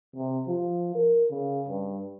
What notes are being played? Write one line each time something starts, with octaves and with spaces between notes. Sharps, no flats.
C3
F3
A#4
C#3
G2